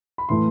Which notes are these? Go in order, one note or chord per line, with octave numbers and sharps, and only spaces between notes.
B5
A2 E3 A3 C6